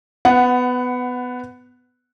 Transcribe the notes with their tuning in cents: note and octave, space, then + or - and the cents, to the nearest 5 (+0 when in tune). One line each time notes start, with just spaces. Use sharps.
B3 +15 F#5 +0